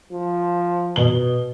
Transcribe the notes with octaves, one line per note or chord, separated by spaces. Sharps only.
F3
B2 G7